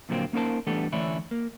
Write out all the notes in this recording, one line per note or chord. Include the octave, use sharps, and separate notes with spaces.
A#2 D3 F3 F#3 A#3 C4
A#3 C#4 D#4 A#4 C5 A5
E3 G3 A3 B3 D4 A4
D3 E3 A3 C#4 D4 E4
A#3